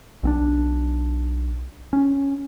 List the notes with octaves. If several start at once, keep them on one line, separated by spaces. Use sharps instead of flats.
B1 C4 D4
C#4